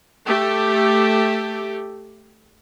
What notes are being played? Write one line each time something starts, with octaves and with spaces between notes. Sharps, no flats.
A3 G4